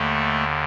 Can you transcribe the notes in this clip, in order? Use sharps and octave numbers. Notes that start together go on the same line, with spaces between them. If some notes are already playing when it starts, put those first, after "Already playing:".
Already playing: D#2 D3 A3